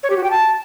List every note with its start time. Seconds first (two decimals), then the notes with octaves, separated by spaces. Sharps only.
0.03 C#5
0.10 G4
0.17 F#4
0.24 G5
0.31 A5